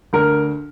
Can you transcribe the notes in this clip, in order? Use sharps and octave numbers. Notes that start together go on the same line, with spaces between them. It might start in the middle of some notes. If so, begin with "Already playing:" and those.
D2 A#4